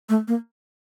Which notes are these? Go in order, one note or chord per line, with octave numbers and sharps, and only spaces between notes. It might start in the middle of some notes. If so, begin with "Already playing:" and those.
A3
A#3